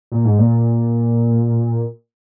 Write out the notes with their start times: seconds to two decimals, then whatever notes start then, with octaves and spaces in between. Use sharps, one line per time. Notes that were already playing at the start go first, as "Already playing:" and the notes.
0.12 A#2
0.25 G#2
0.39 A#2